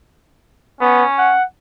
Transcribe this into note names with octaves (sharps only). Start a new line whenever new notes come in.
B3 C#4
F#5